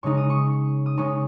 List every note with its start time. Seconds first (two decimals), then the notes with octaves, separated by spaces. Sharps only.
0.03 C#3 G#3 D#4 C#6
0.17 D#6
0.30 C#6
0.86 D#6
0.97 C#3 G#3 D#4 C#6